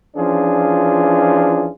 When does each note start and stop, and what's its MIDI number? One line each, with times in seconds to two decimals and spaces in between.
0.17 1.69 52
0.17 1.69 53
0.17 1.69 61
0.17 1.69 62
0.17 1.69 65
0.17 1.69 68